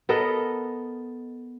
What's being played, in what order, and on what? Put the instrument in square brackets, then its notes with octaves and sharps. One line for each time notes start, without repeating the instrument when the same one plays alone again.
[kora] B3 A4 A#4 D#5